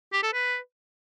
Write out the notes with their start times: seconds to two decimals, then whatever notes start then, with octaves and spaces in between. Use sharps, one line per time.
0.13 G4
0.23 A4
0.33 B4